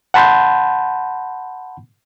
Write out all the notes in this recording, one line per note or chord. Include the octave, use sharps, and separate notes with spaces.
F#5 A5 B5 C6 G6